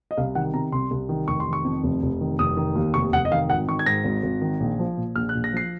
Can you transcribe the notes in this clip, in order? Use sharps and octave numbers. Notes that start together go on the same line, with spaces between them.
D#5
C2 F5
D#3 F#5
C3 A#5
C2 C6
C2
D#3
F1 C#6
C6
D#3
C#6
F2
F1
F1
D#3
F1 D#6
D#3
D#2
F1 C#6
F1 F#5
D#5
D#3 F5
G#1 F#5
D#3 C#6
G#6
G#2 A#6
G#1
G#1
D#3
A#1
F3
A#2
A#1 F6
F#6
A#1
A#6
F3 C7